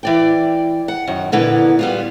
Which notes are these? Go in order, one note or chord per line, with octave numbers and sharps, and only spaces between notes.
E3 D5 G5
F#5
F#2 D#3
A#2 D3 E3 B3
G3 B3 F4